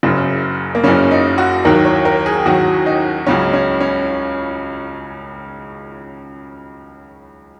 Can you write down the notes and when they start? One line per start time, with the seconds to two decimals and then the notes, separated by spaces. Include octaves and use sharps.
0.03 F#1 F#2 C#3
0.75 A#3
0.83 F#1 F#2 C#3 C#4
1.11 D#4
1.38 F#4
1.65 D#2 D#3 F#3 A#4
1.85 C#5
2.05 A#4
2.26 G#4
2.46 D#2 D#3 F#3 F#4
2.86 D#4
3.27 C#2 C#3 F#3 C#4
3.53 C#4
3.81 C#4